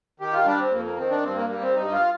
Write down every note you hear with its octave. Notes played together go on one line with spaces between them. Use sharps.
D#3 G4
F4
G3 D4
C4
F2 A#3
A#3
D#3 C4
D4
G2 C4
A#3
G3 A#3
C4
G2 D#4
F4